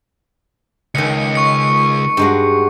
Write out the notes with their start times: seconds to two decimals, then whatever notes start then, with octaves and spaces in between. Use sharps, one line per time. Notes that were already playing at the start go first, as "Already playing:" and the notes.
0.95 C#2 D#3 D#5 C#7
1.35 C#6 C#7
2.17 G2 G#3 F#4